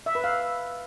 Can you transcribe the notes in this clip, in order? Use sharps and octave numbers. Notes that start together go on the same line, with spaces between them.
E5
B4
F5